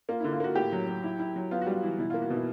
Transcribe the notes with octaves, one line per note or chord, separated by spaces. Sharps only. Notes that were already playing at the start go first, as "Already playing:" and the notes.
A#3 F4
D3 E4
F4
A#3 F#4
A2 G4
F#3
F#3
E4
E4
F#3
B3 F4
F#4
G3 F4
E3
B2 E4
A#3 F4
F#4
B2 E4